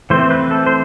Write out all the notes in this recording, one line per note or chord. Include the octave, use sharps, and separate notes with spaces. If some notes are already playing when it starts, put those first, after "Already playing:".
E3 A3 C4 C5
B4
A4
C5